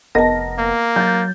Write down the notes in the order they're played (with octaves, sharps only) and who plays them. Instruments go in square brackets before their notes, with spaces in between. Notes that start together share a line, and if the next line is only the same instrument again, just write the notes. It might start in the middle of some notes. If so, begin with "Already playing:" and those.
[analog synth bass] F1 [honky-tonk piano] B3 A#4 A#6 [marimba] D#5 A5
[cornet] A#3
[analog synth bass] F#3 [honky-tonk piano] G6 A6